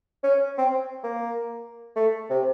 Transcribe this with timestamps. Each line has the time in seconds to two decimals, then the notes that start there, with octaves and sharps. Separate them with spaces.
0.24 C#4
0.58 C4
1.04 A#3
1.96 A3
2.30 C3